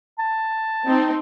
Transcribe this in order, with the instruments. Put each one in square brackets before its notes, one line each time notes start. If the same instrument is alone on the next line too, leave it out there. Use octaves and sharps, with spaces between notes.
[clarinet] A5
[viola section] C4 D#4